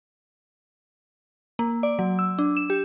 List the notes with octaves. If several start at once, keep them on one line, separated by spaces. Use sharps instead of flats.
A#3
D5
F#3
E6
D4
E7
G4